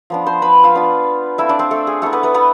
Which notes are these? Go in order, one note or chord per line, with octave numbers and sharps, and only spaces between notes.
F3 B3 D4
C5 C6
B4 B5
F4 F5
B3 D4 F4
A3 C4 E4 F4 E5
D4 D5
C4 C5
A3 A4
G#4
A3 B3 E4 A4
B3 B4
B3 B4
B3 B4